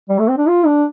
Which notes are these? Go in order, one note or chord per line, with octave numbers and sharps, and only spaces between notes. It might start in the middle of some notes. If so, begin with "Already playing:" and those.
G3
A3
C4
D4
F4
D4